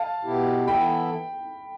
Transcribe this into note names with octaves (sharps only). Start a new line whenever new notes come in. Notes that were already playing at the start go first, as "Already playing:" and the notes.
Already playing: F5 A5
B2 B3 E4 G4
E3 B3 E4 A4 G5 B5